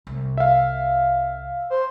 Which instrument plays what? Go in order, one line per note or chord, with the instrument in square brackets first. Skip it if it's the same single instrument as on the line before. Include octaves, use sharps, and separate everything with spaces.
[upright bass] C2
[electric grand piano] E5 F5
[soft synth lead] C5